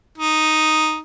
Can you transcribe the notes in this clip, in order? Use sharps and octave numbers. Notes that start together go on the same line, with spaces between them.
D#4